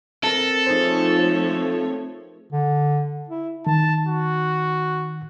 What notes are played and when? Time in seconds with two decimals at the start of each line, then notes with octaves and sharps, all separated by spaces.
0.23 C4 A4 A#4 E6
0.66 F3 A3 D#4 G#4 C5 C#5
2.52 D3
3.29 E4
3.67 D#3 A5
4.07 F#4